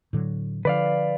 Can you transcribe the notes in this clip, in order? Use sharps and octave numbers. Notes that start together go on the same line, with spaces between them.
A2 D3 F#3
D3 F3 B4 D5 F5